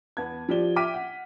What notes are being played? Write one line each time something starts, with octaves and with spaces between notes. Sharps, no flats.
E2 B3 A5 G#6
F3 G4 D5 G7
E5 G5 D6 F6 B6 D#7
F#5